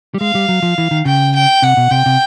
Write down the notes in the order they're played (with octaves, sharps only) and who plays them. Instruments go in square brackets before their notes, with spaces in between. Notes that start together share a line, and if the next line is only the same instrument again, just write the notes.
[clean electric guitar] G3
[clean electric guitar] G#3 [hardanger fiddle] F5
[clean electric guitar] G3
F#3
F3
E3
D#3
[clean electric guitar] C#3 [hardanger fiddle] G5
[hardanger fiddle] G5
[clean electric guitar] C3 [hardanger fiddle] F#5
[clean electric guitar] B2
[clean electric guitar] C3 [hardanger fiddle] G5
[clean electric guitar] C3